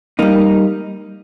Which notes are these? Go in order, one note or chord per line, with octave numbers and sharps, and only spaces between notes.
G3 A#3 D#4